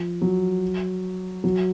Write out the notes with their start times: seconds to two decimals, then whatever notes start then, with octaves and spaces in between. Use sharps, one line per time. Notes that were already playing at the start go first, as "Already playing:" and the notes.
Already playing: F3
0.22 F#3
1.44 F#3